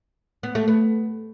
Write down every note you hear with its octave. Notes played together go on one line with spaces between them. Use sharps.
B3
A3
B3